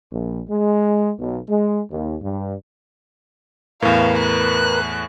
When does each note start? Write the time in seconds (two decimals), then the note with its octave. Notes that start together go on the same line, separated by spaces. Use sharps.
0.12 A#1
0.49 G#3
1.19 B1
1.48 G#3
1.91 D#2
2.22 G2
3.82 E2 A2 A#4 B4 F5
4.18 F#6